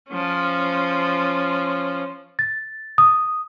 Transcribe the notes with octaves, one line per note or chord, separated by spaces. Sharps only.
F3 C#4
A6
D#6